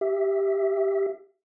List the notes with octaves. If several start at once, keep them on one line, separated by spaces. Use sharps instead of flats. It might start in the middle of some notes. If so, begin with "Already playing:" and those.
G4 E5